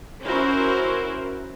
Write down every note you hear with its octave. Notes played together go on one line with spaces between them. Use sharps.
C#4 E4 F#4 A#4 C5